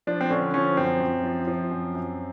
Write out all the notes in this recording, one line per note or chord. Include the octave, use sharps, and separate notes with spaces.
F3 D4
C4
D3 C#4
F3 C#4
F#2 C4
F#2
F3
F3
F#2
F#2